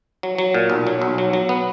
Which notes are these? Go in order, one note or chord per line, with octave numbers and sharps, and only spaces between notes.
F#3
F#3
A#2
B1
F#3
B1
F#3
F#3
B3